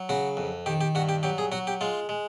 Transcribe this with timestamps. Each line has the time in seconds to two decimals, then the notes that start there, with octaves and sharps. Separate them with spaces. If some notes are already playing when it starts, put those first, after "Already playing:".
Already playing: F#3
0.09 C#3 F#4
0.37 F2
0.66 D#3 G4
0.81 G4
0.95 G2 F#4
1.09 G4
1.23 F#3 G4
1.38 G#4
1.52 F#3 F#4
1.67 G4
1.81 G#3 F4
2.09 G#3